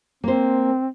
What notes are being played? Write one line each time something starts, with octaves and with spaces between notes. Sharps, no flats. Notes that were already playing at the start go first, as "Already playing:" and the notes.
A#3 C4 C5